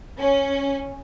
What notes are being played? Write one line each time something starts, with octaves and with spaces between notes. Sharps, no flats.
C#4